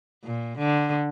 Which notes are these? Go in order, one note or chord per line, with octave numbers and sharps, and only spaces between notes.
A#2
D3